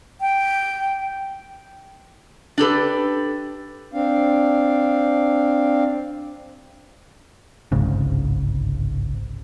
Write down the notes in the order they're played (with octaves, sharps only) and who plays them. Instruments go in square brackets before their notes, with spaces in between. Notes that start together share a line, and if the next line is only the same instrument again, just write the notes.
[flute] G5
[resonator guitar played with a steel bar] D4 G4 A4 B4
[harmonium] C4 D4 F5
[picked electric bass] G1 C2 G#2 C#3